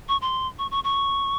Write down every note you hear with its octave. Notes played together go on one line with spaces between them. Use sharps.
C#6
C6
C#6
C#6
C#6